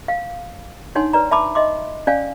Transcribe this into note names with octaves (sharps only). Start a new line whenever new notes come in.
F5
D4 D#4 C#5 F#5 G#5 C6
B4 D5 A#5
E5 A5 B5 D6
D#5 E5 C6 D6
C#4 D5 F5 G#5